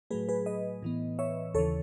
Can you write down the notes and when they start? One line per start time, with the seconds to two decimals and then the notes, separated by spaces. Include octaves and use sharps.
0.11 A2 F#3 A3 G#4 B4
0.29 G#4 B4
0.46 B4 D#5
0.82 A2 E3 B3
1.19 C#5 E5
1.54 D#2 C#3 E3 A4 C#5